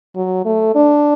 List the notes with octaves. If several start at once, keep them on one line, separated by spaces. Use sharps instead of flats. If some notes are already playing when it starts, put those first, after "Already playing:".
F#3
A3
D4